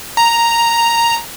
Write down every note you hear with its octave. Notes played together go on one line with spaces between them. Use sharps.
A#5